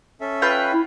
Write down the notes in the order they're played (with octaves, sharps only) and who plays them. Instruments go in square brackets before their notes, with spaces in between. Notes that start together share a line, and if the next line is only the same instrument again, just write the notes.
[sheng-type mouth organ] C#4 A4 E5
[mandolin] F4 B4 G5
[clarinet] E4